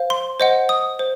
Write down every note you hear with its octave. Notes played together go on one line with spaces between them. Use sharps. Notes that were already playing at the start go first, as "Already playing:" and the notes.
Already playing: C5 F5
C6
C5 D#5 F#5
D#6
C5